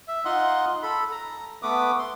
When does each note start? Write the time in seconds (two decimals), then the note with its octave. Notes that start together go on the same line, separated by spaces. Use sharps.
0.08 E5
0.25 D#4 F4 D#5 F#5 C6
0.83 A4 B5
1.12 A#5
1.63 A3 B3 B4 D6 D#6
1.99 C6